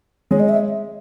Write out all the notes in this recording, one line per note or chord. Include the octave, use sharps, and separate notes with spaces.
G#3 G#4 C#5
D#5
E5